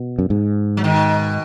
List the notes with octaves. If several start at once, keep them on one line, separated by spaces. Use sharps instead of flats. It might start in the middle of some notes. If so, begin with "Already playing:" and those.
Already playing: B2
F#2
G#2
F#3
B2 D#3